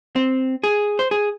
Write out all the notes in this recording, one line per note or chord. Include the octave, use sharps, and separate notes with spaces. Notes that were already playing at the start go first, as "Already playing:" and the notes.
C4
G#4
C5
G#4